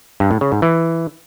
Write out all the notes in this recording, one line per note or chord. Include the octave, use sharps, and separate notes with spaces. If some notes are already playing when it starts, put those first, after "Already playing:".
G2
A2
C#3
G#2
E3